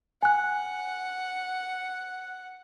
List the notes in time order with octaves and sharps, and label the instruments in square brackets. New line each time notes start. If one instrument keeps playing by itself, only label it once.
[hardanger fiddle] F#5 [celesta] G#5 F#6